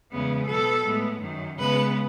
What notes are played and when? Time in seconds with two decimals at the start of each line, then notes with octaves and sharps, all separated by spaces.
0.11 E2 C#3 G#3 B3
0.48 B2 F#3 B3 A4
0.85 A2 G#3 B3
1.22 F#2 D#3 F#3
1.58 C#3 G#3 B3 B4